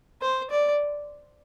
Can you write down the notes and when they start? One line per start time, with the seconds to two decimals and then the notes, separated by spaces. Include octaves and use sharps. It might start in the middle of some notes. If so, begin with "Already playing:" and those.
0.22 C5
0.50 D5